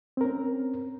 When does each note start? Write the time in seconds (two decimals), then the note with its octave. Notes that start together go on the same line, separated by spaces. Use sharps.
0.17 C4
0.21 A#4
0.24 C#4